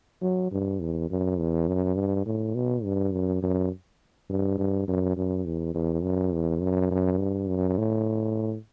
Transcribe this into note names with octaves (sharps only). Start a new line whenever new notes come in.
F#3
G2
E2
F#2
E2
F#2
G2
A2
B2
G2
F#2
F#2
G2
G2
F#2
F#2
E2
E2
F#2
E2
F#2
F#2
G2
F#2
A2